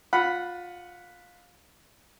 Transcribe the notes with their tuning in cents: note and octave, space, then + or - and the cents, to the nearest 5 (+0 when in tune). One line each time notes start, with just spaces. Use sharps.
F4 +20 F#5 +0 B5 +0